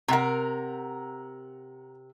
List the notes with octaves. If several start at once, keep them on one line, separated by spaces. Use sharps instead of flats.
C3 A#4 F#5 A#5